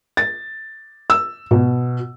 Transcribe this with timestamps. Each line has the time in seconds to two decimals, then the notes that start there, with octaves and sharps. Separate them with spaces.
0.17 A6
1.10 E6
1.51 B2